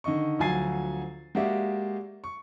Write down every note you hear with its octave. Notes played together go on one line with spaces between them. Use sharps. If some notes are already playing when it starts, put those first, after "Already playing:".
D3 D#3 D#5 C#6
D2 F3 F#3 G#5 A6 C7
G#3 A#3 F#4 G4 D5 E5
C#6